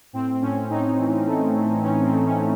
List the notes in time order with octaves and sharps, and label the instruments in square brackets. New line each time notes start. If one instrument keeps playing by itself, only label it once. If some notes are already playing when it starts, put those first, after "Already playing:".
[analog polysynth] A2 C4
A2 C#4
A2 D#4
E3
A3
A3
E3 C#4
C4
A3
C#4
A3